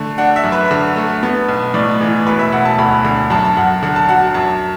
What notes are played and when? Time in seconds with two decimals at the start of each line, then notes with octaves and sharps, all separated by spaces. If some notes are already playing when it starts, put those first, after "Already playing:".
Already playing: D3 A3
0.18 D4 F#5
0.36 E5
0.44 F#2
0.52 B4
0.71 D3
0.96 A3
1.23 B3
1.48 B1
1.74 A2 D5
2.01 E3
2.26 E1 B4
2.39 E5
2.52 E1 F#5
2.65 A5
2.79 D2 B5
3.05 D3
3.30 F#2 A5
3.45 A5
3.57 F#2 F#5
3.83 D3 F#5
3.96 A5
4.09 F#3 F#5
4.34 F#2 A5